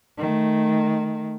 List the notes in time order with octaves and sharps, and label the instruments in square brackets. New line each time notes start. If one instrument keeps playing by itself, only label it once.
[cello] D#3 A3